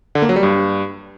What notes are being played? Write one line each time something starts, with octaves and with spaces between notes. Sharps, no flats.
D3
A#3
F#3
G3
G2